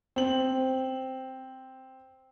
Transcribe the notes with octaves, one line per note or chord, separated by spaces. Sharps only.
C4 F#7